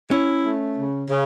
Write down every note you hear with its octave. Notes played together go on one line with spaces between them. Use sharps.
C#4 E4
A3
C#3
C#3